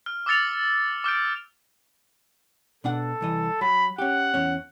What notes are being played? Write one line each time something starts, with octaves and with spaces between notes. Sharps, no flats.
F6
D6 E6 F6 A6 C#7 F7
D6 F6 G6 D7
B2 D4 A4 F#5
C2 E3 D#5
F#3 B5
C#4 G4 F#5
E2 C#4